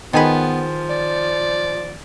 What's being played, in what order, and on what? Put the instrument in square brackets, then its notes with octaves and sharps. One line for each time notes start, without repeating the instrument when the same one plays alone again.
[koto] D#3 G#4 B4 [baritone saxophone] F3 [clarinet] B3
[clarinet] D5